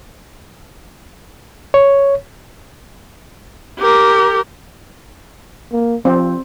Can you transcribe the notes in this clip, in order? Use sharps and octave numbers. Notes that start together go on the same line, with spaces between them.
C#5
G4 A#4
A#3
F3 C4